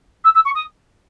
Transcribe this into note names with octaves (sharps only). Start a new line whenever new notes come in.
E6
E6
C#6
D#6